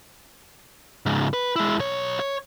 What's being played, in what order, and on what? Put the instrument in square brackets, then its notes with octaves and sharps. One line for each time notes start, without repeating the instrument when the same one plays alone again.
[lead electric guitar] C#2 G#2
B4
G#3 E4
B1 C#5
C#5